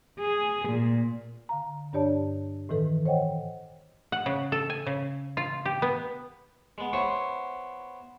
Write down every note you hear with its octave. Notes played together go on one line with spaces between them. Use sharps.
G#4
A#2
D3 F5 A#5
G2 D4 G4 C#5 D5 A5
A2 D#3 E3 A4 B4
C5 C#5 D#5 F#5 G5
F#5
C#3
A4
G#5
C#3
F4
G4
B3
G#3 B3
B3 E4 C5 C#5